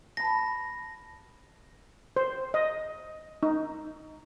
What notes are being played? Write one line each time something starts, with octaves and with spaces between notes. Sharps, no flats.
A5 B5 A#6
C5
D#5
D#4